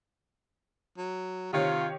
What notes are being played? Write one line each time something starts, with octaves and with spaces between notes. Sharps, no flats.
F#3
C3 D#3 F4 G4 C#5